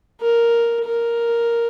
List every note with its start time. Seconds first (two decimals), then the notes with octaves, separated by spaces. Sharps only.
0.21 A#4
0.85 A#4